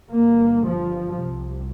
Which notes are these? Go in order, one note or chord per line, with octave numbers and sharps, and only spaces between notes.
G1 G2 A#3
F3
C2 C3